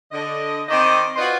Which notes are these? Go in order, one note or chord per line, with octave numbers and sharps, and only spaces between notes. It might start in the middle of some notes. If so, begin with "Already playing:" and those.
D3 D#5
D#3 C4 D#4 D5 D#5
F4 F#4 B4 C5 D5 D#5